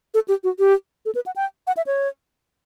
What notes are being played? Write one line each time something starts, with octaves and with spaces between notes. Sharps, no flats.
A4
G4
F#4
G4
A4
B4
F#5
G5
F#5
E5
C#5